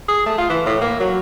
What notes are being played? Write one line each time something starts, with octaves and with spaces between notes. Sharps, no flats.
G#4
A3
F4
E3
A2
A#3
F#3